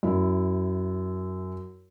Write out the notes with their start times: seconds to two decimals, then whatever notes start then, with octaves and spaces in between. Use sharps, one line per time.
0.03 F#2 E4